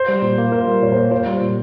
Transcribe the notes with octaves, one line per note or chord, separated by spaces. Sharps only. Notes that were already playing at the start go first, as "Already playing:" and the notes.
Already playing: C5
G3
A#2
A#3
F4 A#4
G3
A#2 C#5
A#3 C5
F4 C5
G3
A#2